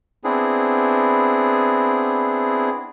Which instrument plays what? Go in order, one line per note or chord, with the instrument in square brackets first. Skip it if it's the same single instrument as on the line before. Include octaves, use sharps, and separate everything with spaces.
[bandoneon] B3 C4 D4 E4 G#4